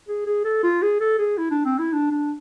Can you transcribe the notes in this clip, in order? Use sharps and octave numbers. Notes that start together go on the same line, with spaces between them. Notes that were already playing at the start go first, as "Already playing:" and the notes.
G#4
G#4
A4
F4
G#4
A4
G#4
E4
D4
C4
E4
D4
D4